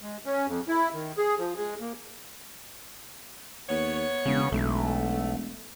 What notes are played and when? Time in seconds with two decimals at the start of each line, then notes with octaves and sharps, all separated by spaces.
0.01 G#3
0.25 C#4
0.47 F2
0.68 E4
0.94 D#3
1.18 G#4
1.39 F3
1.57 G#3
1.81 A#3
3.70 D#2 B3 C#5
4.26 E1 C#3
4.52 E1 B1 A3